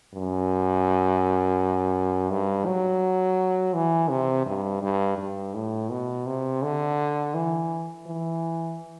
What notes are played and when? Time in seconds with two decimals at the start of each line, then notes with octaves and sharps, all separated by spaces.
0.14 F#2
2.30 G2
2.66 F#3
3.74 E3
4.10 C3
4.46 G2
4.82 G2
5.18 G2
5.55 A2
5.90 B2
6.27 C3
6.63 D3
7.34 E3
8.07 E3